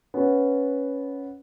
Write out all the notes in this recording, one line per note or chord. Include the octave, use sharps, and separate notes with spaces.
B3 C#4